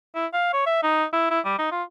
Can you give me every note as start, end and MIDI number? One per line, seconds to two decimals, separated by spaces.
0.15 0.26 64
0.33 0.49 77
0.53 0.66 73
0.66 0.80 76
0.83 1.05 63
1.13 1.30 64
1.31 1.40 64
1.45 1.57 55
1.59 1.70 63
1.71 1.83 65